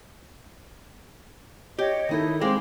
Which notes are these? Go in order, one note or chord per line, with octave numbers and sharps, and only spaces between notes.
G4 C#5 D#5
D#3 D#4 E4 A4
G3 G#3 C4 C5 F5 G5 D6